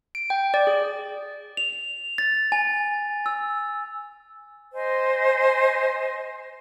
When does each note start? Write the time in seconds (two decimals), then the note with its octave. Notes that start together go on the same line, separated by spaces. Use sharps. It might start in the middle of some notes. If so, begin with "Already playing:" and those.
0.15 D7
0.30 G5
0.54 D5
0.67 G#4
1.57 F7
2.18 A6
2.52 G#5
3.26 E6
4.74 C5 D#5 G#5